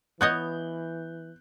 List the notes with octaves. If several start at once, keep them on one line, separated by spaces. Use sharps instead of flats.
E3 B3 C#5 D#5 F#6 G6